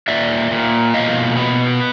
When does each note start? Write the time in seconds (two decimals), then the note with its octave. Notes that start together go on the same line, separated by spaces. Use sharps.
0.08 A#2 D5 E5
0.51 A#2
0.94 B2 D#5 F5
1.36 B3